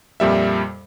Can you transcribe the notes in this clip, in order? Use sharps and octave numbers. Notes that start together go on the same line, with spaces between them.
F2 A#2 G3 E5